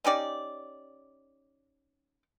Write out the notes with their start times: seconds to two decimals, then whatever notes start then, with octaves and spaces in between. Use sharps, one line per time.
0.04 C#4 D#4 G4 D5